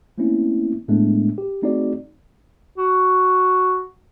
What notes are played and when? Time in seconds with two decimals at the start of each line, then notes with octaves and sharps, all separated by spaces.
0.18 A3 A#3 C4 C#4 E4
0.88 A2 G#3 A3 B3 D4
1.38 G4
1.62 A3 C4 D#4 F#4 G#4 D5
2.78 F#4